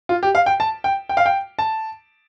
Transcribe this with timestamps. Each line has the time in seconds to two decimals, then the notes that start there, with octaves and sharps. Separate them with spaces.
0.09 F4
0.23 G4
0.35 F5
0.46 G5
0.60 A5
0.84 G5
1.09 G5
1.17 F5
1.26 G5
1.59 A5